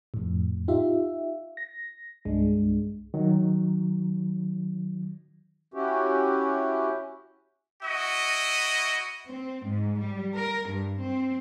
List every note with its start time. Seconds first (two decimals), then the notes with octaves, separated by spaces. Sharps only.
0.14 F2 A2
0.68 D#4 F4 G4 E5
1.57 A#6
2.25 C2 G2 G#3 D4
3.14 D#3 F#3
5.74 C#4 E4 F#4 G4
7.83 E4 F#4 D#5
9.27 C4
9.65 G#2
10.00 G3
10.34 A#4
10.68 G2
11.00 C4